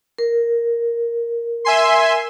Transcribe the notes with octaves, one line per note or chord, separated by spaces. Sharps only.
A#4
E5 G#5 C6